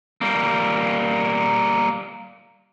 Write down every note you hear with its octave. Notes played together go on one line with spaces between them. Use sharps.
G3 A#3